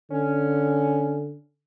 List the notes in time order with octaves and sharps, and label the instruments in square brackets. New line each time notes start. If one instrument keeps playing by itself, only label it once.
[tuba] D3 [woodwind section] C#4